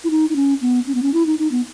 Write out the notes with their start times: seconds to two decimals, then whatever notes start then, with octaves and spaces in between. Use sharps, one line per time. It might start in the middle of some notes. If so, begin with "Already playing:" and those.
0.04 E4
0.10 D#4
0.29 D#4
0.36 C#4
0.61 B3
0.87 C#4
0.95 B3
1.02 C#4
1.14 E4
1.26 D#4
1.39 D#4
1.52 B3